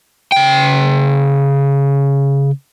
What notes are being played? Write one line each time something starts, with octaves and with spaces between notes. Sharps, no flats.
C#3 G5